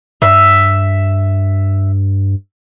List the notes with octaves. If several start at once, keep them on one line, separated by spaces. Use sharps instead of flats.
G2 E5